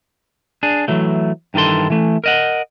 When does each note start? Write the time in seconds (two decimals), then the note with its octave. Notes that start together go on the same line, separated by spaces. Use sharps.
0.63 D4 G#4
0.88 E3 F#3 A3
1.54 G2 D#3 E3 A4 C6
1.90 E3 A3
2.24 A#4 D#5 F#5